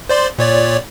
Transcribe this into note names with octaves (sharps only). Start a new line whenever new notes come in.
C5 D5 C6
A#2 C#5 D5